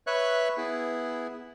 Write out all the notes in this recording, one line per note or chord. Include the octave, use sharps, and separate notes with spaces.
B4 C#5 E5 C#6 F#6
B3 E4 G#4